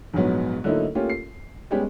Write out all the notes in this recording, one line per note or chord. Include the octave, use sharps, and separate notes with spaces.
A#1 G#2 F#3 B3
D3 F#3 A3 A#3 D#4 E4
A3 A#3 C#4 F4 G4
C7
G3 G#3 B3 C#4 G4